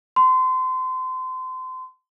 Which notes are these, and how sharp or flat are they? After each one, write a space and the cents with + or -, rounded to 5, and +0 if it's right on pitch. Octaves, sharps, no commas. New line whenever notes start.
C6 -30